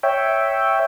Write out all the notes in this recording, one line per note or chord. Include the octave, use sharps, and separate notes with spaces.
C#5 E5 G5